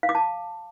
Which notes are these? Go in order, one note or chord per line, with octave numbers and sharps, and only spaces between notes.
F5
D6
A5